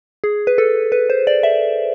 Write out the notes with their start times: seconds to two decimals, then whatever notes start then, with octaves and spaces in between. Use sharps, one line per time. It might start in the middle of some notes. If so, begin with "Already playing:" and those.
0.24 G#4
0.47 B4
0.58 A4
0.92 B4
1.10 C5
1.27 D5
1.43 E5